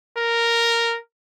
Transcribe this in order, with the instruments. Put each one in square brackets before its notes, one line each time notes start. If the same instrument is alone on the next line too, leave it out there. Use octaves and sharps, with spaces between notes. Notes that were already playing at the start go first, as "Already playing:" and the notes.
[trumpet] A#4